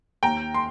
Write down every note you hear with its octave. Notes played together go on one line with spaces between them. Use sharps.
D#2 G5 A#5
C6